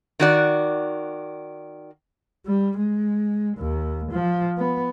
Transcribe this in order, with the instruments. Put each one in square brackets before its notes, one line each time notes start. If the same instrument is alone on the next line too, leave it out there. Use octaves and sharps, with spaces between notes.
[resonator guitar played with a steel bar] D#3 F#4 D5
[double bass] G3
G#3
D#2
F3
B3